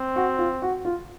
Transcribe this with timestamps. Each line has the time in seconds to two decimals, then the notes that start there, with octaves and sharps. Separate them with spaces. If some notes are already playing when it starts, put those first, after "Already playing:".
Already playing: C4
0.16 F#4
0.38 F4
0.62 F#4
0.85 F4